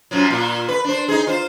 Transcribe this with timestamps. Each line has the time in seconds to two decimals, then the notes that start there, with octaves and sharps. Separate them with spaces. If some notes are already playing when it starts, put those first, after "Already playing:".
0.11 F#2 F3 F#3
0.30 A#2 F4
0.68 B4
0.84 D4 C5
1.08 D#4 G#4
1.27 F4 C5